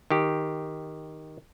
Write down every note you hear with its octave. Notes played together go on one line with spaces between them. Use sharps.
D#3 G4